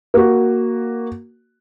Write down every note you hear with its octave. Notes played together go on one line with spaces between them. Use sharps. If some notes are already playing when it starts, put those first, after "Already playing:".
A#3 F#4